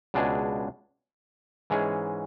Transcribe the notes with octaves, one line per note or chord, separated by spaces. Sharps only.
C#2 B2 G#3 D4 G#4
G#2 E3 G#3 C#4 G#4